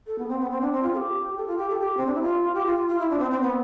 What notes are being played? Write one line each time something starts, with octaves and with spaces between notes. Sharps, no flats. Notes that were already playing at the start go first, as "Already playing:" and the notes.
A4
B3
C4
B3
C4
D4
C4
F4
A4
G4
A4
F4
G4
A4
G4
C4
D4
E4
F4
G4
F4
F4
E4
D4
C4
C4
B3